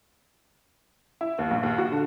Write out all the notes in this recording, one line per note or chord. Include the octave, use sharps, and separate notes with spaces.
E4
D#2
A#1
D#2
F#4
D3